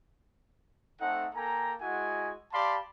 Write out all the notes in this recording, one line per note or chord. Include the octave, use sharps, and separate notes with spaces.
A3 C4 D#4 A4 F#5
A#3 A4 G5 G#5 A#5
G#3 E4 F#4 D#5 F#5 G#5
G4 D5 F5 A5 B5 C6